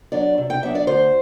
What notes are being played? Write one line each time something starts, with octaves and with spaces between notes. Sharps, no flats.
F#3 B3 D4 D5
C3
G5
F#3 B3 D4 E5
D5
D2 C5